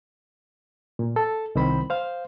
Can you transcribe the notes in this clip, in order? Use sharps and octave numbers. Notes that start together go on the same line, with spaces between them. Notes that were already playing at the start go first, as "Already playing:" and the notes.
A#2
A4
C2 D#3 C4 C5 B5
C5 F5